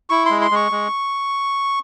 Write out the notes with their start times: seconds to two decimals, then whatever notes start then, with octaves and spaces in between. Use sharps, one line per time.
0.10 E4 C#6
0.26 G#3 C6
0.41 C6
0.51 G#3 C#6
0.72 G#3